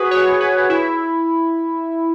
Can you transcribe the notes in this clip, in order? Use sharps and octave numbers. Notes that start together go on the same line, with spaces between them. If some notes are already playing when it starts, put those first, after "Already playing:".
Already playing: F#4 G#4 B4
C#5
B4
E4